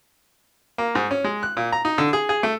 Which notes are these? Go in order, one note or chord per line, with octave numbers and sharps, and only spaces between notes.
A#3
G#2
C#4
G#3
F#6
A#2
A#5
D#4
D3
G#4
G#4
A3